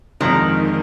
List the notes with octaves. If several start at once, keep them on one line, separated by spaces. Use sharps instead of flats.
F2 D3 D#3 F3 G#3 C4